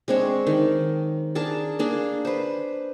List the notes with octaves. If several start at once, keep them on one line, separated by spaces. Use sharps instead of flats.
G#3 C4 D4 C#5
D#3
D4 G#4 A#4 A5
A#3 D4 G#4
B4 C5